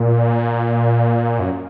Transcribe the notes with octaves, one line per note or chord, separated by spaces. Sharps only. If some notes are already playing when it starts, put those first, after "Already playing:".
Already playing: A#2
F#2